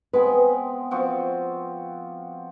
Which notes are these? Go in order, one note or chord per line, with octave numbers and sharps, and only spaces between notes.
G#3 B3 C4 B4
F3 C4 F#4